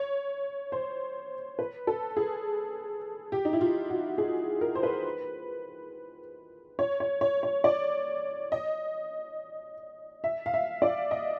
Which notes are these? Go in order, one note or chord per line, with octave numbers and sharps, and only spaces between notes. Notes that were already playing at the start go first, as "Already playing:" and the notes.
Already playing: C#5
C5
B4
A4
G#4
G4
D#4
E4
F4
F#4
G#4
A#4
C5
B4
C#5
C#5
C#5
C#5
D5
D#5
E5
F5
E5
D5
D#5